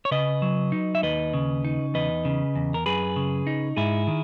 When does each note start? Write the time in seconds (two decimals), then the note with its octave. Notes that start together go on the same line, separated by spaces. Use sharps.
0.05 C#5
0.11 C#3 B4 D#5
0.42 F#3
0.72 D#4
0.95 E5
1.03 D#2 B4 D#5
1.34 C#3
1.65 D#4
1.94 E2 B4 D#5
2.25 C#3
2.55 E2
2.74 A#4
2.86 F#2 G#4 B4
3.16 C#3
3.47 D#4
3.77 G#2 E4 G#4
4.07 D#3